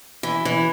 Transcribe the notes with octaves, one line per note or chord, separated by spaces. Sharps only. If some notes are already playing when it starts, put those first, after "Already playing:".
E3
E3